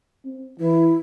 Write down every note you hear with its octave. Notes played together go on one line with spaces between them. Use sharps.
C4
E3 E4